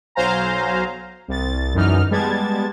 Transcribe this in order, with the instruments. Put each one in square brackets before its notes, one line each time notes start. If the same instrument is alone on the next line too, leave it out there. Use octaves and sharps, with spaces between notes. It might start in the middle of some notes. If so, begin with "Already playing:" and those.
[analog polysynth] B1 F#3 C5 F5 G#5 A#5
C2 A6
F#2 D3 E3 D#4 F6
G3 G#3 B3 A5 G#6 A6